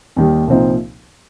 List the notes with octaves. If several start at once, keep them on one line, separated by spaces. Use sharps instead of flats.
D#2 D#3 G3
C2 A#2 F3 C4 D#4